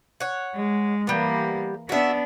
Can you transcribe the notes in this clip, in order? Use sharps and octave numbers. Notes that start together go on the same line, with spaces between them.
C#5 F#5
G#3
E3 G3 A#3 B3
B3 D4 F#4 E5